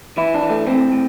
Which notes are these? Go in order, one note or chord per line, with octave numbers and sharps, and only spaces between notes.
E3 E4
D4
E3
A3
A2 C4
A2